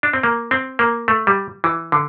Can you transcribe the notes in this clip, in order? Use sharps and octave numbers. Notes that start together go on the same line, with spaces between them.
D4
C4
A#3
C4
A#3
A3
G3
E3
D3